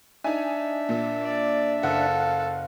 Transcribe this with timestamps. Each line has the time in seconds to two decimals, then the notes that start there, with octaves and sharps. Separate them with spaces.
0.24 D4 D#4 E5 G#5
0.89 A#2
1.23 D5
1.83 F#1 A4 F5 F#5